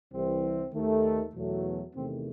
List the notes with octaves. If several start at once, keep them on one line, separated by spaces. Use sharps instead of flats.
C2 C3 E3 C4
D#2 D#3 A3
E2 B2 F#3 A3
E2 C3 D#3 A3 C4